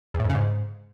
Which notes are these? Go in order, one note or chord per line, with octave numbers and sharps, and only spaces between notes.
E2
A2
F2
C#3
G#2